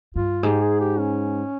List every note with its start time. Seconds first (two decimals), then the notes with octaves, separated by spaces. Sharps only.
0.16 G2 F4
0.43 G#2 G4
0.62 G#4
0.80 G4
0.98 C#4